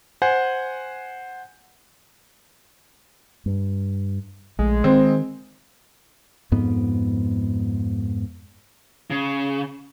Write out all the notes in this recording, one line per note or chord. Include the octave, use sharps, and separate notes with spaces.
C5 F#5 G#5
G2
A#1 G#3 A3
D#3 C4
F2 G#2 B3
C#3